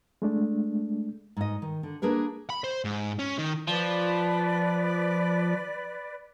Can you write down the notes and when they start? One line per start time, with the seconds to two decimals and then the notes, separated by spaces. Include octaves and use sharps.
0.22 G#3 A3 D4
1.37 G#2 D#5
1.62 D#3
1.83 D3
2.02 A#3 D4 G#4 A#4 B4
2.50 B5
2.64 C5
2.85 G#2
3.19 C#4
3.38 D#3
3.67 F3 B4 D5